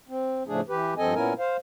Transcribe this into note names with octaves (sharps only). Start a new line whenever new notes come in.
C4
A2 C#3 F3 A3 D4 G#4
E3 G4 B4
G2 F3 C4 A4 D#5 G#5
A#2 B3 C#4 E4 A#4 G#5
C5 F5